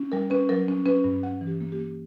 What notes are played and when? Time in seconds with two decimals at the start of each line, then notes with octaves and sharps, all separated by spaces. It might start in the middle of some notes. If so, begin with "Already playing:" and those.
Already playing: C#4
0.12 G3 A#4
0.30 C#4 B4
0.49 F#3 A#4
0.68 C#4
0.86 C#4 B4
1.04 G2
1.23 C#4 F#5
1.41 E3
1.47 G4
1.61 A#3
1.72 G4
1.79 A#3